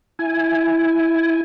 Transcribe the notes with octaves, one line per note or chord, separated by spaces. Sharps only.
E4 G#5